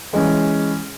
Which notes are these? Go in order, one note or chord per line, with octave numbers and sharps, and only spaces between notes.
E3 G#3 C#4